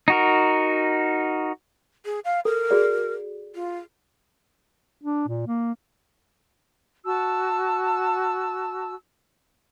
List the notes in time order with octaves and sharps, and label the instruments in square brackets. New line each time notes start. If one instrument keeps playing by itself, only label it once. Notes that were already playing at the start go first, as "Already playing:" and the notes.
[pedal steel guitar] D#4 F#4 A#4
[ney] G#4
F5
[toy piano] A4 [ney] A#4
[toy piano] F#4 G#4 D5
[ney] F4
[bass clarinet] D4
A#2
A#3
[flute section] F#4 A5 E6